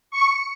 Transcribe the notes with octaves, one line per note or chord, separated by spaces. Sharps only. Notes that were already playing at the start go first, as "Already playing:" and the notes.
C#6